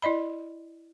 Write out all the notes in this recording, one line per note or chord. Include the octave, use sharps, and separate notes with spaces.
E4 D5 D#5 B5